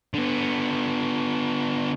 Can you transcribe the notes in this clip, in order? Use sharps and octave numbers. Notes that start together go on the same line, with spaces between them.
D3 B3